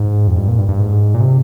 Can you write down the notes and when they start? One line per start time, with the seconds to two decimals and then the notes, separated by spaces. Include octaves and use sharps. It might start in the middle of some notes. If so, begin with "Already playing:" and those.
Already playing: G#2
0.27 F2
0.37 G2
0.48 A#2
0.58 G2
0.69 G2
0.79 G#2
1.14 A#2
1.20 C3